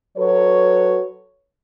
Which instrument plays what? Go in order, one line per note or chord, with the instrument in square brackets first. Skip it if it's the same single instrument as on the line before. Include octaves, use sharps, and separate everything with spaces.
[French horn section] F#3 F#4 A4 B4 C#5